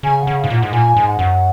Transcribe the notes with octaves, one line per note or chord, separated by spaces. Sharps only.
C#3 G#5
F#5
C#3
F5
G#2
A#2
F#5
G#2
A#2 G#5
G#2
F#5
F#2